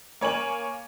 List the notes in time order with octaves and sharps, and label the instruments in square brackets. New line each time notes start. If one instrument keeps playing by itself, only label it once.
[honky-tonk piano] A#3 C#5 G#5 F#7